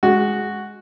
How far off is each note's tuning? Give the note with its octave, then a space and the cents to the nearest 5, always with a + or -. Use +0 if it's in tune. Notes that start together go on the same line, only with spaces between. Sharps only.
G#3 +0 F#4 +0